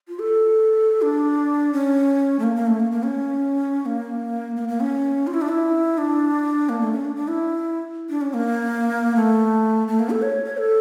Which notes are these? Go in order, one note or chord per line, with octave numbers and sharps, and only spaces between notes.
F4
A4
D4
C#4
A3
A#3
A#3
A3
A#3
A#3
C#4
A#3
A#3
A#3
C#4
F4
E4
D4
E4
D4
A#3
A3
C#4
D4
D4
E4
D4
C#4
A#3
A3
A3
A#3
A4
C#5
C#5
A4